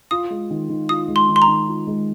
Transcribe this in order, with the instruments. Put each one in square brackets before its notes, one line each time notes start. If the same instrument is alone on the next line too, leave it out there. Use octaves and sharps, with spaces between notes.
[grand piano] F4 [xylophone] D#6
[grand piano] G#3
D#3
D#3
[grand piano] F4 [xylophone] D#6
[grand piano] G#3
[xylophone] C6
[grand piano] D#3
[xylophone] C6
A#5
[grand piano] D#3
F4
G#3